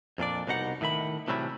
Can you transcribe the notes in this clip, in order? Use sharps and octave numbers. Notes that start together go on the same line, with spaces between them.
F2 A#2 D4 D5
C2 B2 D#4 F#5
A2 D#3 E5 B5
A2 C3 E3 F#3 G3 E4